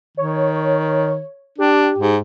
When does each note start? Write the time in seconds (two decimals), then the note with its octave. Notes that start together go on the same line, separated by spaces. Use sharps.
0.17 D#3 C#5
1.58 D4 G4
1.98 G#2